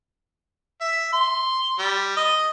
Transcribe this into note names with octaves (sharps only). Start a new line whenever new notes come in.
E5
C6
G3
D#5